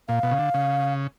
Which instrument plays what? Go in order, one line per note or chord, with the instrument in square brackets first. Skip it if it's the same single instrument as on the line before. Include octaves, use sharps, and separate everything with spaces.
[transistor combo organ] A#2 [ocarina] F5
[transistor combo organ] B2
C#3
D3
C#3